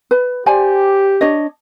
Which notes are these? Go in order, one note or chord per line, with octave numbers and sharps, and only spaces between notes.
B4
G4 C5 D5 G#5
D4 C#5 D#5